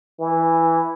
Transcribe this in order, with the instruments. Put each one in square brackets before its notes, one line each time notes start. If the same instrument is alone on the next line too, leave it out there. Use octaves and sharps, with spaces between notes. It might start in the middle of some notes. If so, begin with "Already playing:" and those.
[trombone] E3